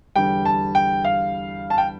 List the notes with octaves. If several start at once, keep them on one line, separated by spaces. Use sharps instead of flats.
E2 D3 G3 G5
A5
G5
F5
A5
G5